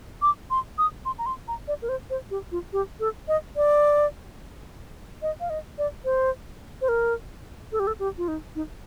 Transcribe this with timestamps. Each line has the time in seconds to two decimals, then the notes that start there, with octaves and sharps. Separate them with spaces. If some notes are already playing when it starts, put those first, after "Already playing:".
0.22 D6
0.50 C6
0.78 D#6
1.05 C6
1.18 A#5
1.26 C6
1.48 A#5
1.68 D5
1.82 A#4
1.89 C5
2.10 C5
2.31 G4
2.52 F4
2.73 G4
3.00 A4
3.28 D#5
3.56 D5
5.22 D#5
5.41 F5
5.50 D#5
5.78 D5
6.05 C5
6.81 C5
6.89 A#4
7.72 A4
7.80 G4
7.87 A4
7.99 G4
8.18 F4
8.28 D#4
8.55 D#4